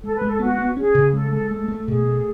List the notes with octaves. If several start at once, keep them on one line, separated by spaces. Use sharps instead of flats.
G#3 A4
B4
G#3
A4
B3 F#4
B3
C#4 G#4
C#3
G#3 A4
G#3 A4
A3 A4
A3
B2 G#4
A3